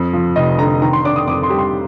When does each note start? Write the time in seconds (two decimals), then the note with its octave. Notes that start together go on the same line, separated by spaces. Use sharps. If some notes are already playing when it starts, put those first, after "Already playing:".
Already playing: F2 F3
0.13 F3
0.36 F1 D#5
0.58 D3 A#5
0.82 D#3 A#5
0.93 C6
1.05 D4 D6
1.16 D#6
1.27 F2 D6
1.43 C6
1.50 G3
1.58 C6